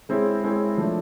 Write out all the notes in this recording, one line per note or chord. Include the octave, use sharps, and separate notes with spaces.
G#3 C4 E4 G#4 C#5
G#3 C4 E4 G#4 C#5
F3 A3 D4